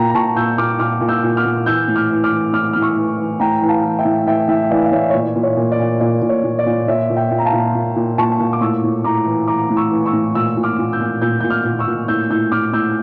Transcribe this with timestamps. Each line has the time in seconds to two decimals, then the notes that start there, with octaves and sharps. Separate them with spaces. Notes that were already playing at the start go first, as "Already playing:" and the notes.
Already playing: A#2 G5 A#5
0.10 A#5
0.14 A#2 A5 C#6
0.36 A#2 E6 G6
0.58 A#2 D6 F6
0.79 A#2 D6 F6
1.01 A#2
1.09 E6 G6
1.23 A#2
1.37 D6 F6
1.45 A#2
1.66 E3 E6 G6
1.88 A2
1.96 D6 F6
2.10 E3
2.24 D6 F6
2.32 E3
2.53 A2 D6 F6
2.73 A2 F6
2.82 C#6 E6
2.97 E3
3.18 E3
3.40 A2 G5 A#5
3.62 E3
3.69 F5 A5
3.84 E3
3.99 E5 G5
4.05 A2
4.27 E3 E5 G5
4.48 A2 E5 G5
4.70 E3 D5 F5
4.84 F5
4.92 A2 C#5 E5
5.10 C#5
5.14 A#2 D5
5.36 A#2
5.43 C#5
5.57 A#2
5.72 D5
5.79 A#2
6.00 A#2 D5
6.22 A#2
6.29 C#5
6.44 A#2
6.59 D5
6.66 A#2
6.88 A#2 C#5 E5
7.10 A#2
7.16 E5 G5
7.31 A#2
7.38 A#5
7.45 F5 A5
7.53 A#2
7.75 A#2
7.96 A#2
8.18 A#2 A5 C#6
8.40 A#2
8.53 D6
8.61 A2 C#6 E6
8.84 A2
9.04 A2 A#5 D6
9.26 E3
9.47 E3 A#5 D6
9.70 A2
9.77 C#6 E6
9.91 E3
10.06 C#6 E6
10.13 A2
10.35 A#2 C#6 E6
10.57 A#2
10.63 D6 F6
10.79 A#2
10.93 E6 G6
11.00 A#2
11.21 A#2 E6 G6
11.41 A#2 G6
11.50 D6 F6
11.65 A#2
11.79 C#6 E6
11.87 A#2
12.08 A2 E6 G6
12.30 A2 E6 G6
12.52 A2 D6 F6
12.73 A2 E6 G6